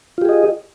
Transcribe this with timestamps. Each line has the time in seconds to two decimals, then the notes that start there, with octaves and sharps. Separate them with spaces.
0.18 F4
0.22 G4
0.25 G#4
0.29 D#5